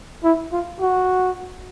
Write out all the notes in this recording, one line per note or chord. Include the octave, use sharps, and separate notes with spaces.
E4
F4
F#4